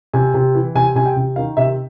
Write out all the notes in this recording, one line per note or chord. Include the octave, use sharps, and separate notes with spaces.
C3 G#5
C3
E3
C3 G#5
C3 G#5
G5
C3
D#3 F5
C3 E5